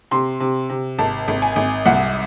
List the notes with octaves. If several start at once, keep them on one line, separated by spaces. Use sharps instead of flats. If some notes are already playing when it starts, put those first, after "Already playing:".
C3 C6
C3
C3
G#1 A5
G#1
G#5
G#1
C2 F#5